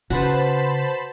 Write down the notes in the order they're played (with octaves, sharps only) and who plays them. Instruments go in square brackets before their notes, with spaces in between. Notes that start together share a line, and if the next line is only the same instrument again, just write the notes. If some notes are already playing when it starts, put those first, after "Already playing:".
[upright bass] C#3 [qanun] F#4 B4 [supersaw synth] C5 A5 B5